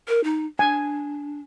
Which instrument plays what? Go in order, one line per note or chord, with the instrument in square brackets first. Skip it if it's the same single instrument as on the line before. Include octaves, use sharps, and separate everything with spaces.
[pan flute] A#4
D#4
[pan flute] D4 [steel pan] G#5